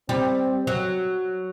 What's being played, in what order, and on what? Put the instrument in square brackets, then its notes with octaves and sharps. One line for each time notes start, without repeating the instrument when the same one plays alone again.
[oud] G3 [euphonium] C4
[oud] F#3